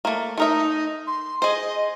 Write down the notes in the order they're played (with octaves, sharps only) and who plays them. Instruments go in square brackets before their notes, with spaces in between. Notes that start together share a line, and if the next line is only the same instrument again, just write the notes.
[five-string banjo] A3 A#3
[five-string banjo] A3 A#4 E5 [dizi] D#4
[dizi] C6
[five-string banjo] G#4 C5 [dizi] D#5